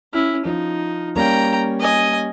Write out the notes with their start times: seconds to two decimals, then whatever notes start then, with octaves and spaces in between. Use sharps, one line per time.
0.13 C#4 E4 F6
0.45 F3 D#4
1.16 G3 A#3 C#4 G5 A#5
1.80 D#5 G#5